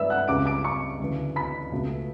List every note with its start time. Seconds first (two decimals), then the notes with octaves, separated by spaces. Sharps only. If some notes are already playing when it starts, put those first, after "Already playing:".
Already playing: G2 E3 A3 B4 D5 E5 E6
0.10 F#5 F#6
0.28 C#2 C#3 G3 D6 D7
0.46 D6 D7
0.64 C#6 C#7
1.00 D2 C#3 E3
1.36 B5 B6
1.71 C#2 B2 A3